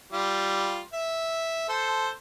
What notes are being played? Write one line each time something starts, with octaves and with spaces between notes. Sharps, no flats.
G3 F4
E5
A4 C5